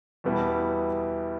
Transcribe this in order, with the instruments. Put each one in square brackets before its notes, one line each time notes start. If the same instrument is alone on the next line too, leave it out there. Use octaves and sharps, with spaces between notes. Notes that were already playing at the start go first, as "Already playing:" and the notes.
[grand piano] E2 B2 G3 B3 E4